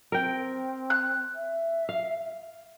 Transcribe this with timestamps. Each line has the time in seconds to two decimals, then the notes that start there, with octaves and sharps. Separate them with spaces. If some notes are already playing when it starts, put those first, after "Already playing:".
0.12 C4 A#4 G5
0.90 F#6
1.35 E5
1.89 F5